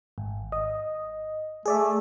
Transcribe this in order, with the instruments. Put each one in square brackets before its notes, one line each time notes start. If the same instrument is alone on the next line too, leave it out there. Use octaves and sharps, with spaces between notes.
[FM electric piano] G#1
D#5
[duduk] A3 [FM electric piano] G#4 D5 E5